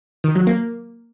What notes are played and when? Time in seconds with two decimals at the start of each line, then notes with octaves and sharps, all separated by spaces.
0.24 D#3
0.35 F#3
0.47 A#3